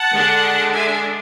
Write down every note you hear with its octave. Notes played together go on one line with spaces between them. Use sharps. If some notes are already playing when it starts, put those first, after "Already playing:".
Already playing: F#5 A5
D3 G#3 D4
E5 G#5